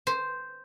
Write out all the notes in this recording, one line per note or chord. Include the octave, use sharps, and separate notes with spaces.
C5